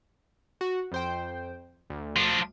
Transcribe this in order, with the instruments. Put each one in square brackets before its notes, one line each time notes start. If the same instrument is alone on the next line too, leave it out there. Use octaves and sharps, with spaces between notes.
[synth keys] F#4
F2 C5 G5
D2
[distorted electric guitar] F3 D4